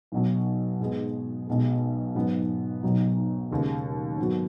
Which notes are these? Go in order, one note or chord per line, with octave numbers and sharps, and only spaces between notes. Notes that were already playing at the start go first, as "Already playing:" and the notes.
B1 B2 F#3
G#2 G#3 B3 G#4
B1 B2 G#3
G#2 F#3 B3
B1 B2 F#3 D#4
D#2 C#3 G#3
G#2 F#3 B3 F#4